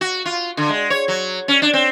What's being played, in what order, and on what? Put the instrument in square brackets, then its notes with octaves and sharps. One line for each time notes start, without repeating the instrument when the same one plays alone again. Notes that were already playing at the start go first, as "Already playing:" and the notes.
[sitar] F#4
F4
D3
G#3
C#5
F#3
C#4
D4
C4